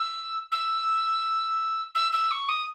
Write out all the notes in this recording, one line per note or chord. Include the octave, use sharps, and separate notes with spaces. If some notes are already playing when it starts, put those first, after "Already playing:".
Already playing: E6
E6
E6
E6
C#6
D#6